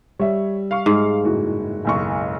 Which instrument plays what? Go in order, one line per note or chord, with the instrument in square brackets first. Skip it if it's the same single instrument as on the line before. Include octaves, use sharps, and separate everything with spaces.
[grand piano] G3 E5 [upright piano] C#5
[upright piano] F5 C#6
[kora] G#2
[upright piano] F#1 A2 F#4
F#1 B1 C#6